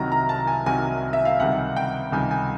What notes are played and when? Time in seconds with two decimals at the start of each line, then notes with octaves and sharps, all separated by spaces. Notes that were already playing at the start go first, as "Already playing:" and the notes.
Already playing: C2 C3 D#3 F#3 A#5
0.12 A#5
0.29 A5
0.47 G#5
0.66 C2 C3 D#3 F#3 G#5
1.13 E5
1.25 F5
1.40 C#2 C3 D#3 G3 F#5
1.76 G5
2.12 C#2 C3 D#3 G3 G#5
2.31 G#5